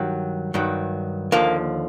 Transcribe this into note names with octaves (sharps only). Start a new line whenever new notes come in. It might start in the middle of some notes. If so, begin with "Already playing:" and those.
Already playing: G2 D#3 F#3
G2 D#3 F#3
D#2 D3 F3 A#3